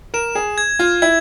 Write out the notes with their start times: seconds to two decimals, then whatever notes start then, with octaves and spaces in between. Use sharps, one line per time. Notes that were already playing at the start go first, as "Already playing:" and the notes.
0.14 A#4 E7
0.35 G#4
0.58 G#6
0.79 F4
1.02 E4 G#6